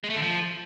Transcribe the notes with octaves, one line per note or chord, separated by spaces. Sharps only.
G#3
A3
D3
F3